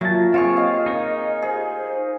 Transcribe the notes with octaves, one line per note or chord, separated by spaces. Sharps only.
A#2 F#3 E5 A5
C4 F4 G#4 C#5
D#5 F5
D#4 A#4 C#5
G#4 C5